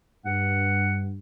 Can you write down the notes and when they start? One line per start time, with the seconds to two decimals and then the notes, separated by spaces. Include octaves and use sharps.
0.25 G2 F#5